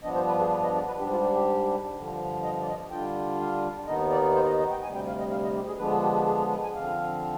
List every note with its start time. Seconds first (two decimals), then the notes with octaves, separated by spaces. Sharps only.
0.03 G2 F3 B3 D4 D#5
0.15 C5
0.28 B4
0.39 G#4
0.51 B4
0.63 D#5
0.75 D5
0.87 B4
0.99 G#2 G3 D4 G4
1.11 F4
1.23 G4
1.35 G4
1.95 G2 D3 F3
2.43 D#5
2.62 D5
2.68 D#5
2.91 D3 G3 D4 F4 G5
3.40 F5
3.87 D#2 D#3 B3 D#4 D#5
4.11 D5
4.35 C5
4.47 D#5
4.59 D#5
4.71 G5
4.83 D2 C3 G3 G#5
4.95 G5
5.07 F5
5.19 D#5
5.31 F5
5.43 D#5
5.55 G4
5.67 G#4
5.79 D3 F3 G#3 B3 D4 B4
5.91 G#4
6.03 G4
6.15 G4
6.27 G#4
6.39 G#4
6.51 B4
6.63 G#5
6.75 D3 F3 C4 F5